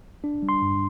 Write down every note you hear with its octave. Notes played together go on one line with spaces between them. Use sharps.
D4
G3
C6
G2